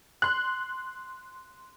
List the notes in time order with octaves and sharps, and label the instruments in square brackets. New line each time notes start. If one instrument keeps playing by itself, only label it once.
[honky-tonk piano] C6 F#6